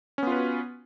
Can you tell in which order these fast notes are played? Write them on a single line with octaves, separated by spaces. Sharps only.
C#4 B3 F4 B4 F#4